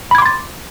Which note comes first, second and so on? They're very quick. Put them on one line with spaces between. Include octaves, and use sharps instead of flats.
B5 G#6 D6 C6 A6